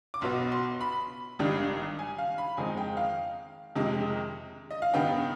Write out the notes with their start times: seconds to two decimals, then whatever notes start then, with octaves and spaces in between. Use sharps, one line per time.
0.14 D6
0.21 B1 B2 B3 C6
0.52 C6
0.81 B5
1.39 G#1 G2 D#3 G3 D4
1.99 G#5
2.18 F5
2.38 B5
2.57 F2 D#3 G#3 C4 D#4 G#5
2.77 G5
2.97 F5
3.76 F2 C3 D#3 G#3
4.71 D#5
4.82 F5
4.93 G2 D#3 B3 D#4 G5